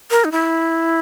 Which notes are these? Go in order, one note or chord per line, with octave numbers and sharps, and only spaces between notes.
A#4
D#4
E4